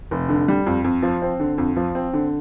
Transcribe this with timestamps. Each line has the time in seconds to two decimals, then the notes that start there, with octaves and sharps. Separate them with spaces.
0.11 F1
0.29 D3
0.48 G3
0.66 F2
0.84 F2
1.03 F3
1.22 C4
1.40 D3
1.58 F2
1.76 F3
1.95 C4
2.13 D3